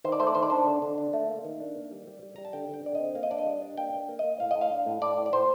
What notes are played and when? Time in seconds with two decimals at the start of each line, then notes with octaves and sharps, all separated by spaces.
0.04 D#3 C5
0.12 D5
0.20 A3 C5
0.27 D5
0.35 D#3 C5
0.43 D5
0.50 D4 C5
0.67 D3
0.82 D3
0.98 D4
1.13 A3
1.29 A#3
1.44 D#3
1.60 D4
1.75 A#3
1.91 G3
2.07 G3
2.22 G3
2.36 G3 A#5
2.45 A5
2.53 D3 G5
2.69 D3
2.74 G5
2.84 D3 D5
2.95 C4 D#5
3.15 A#3 F5
3.23 D#5
3.31 D4 D5
3.38 D#5
3.46 G3
3.62 D4
3.77 A#3 G5
3.93 D4
4.09 A#3
4.19 D#5
4.24 A#3
4.40 A2 F5
4.51 A2 D#5
4.61 F5
4.71 D4
4.86 A2
5.02 A2 D5
5.17 A2
5.26 D5
5.33 A2 C5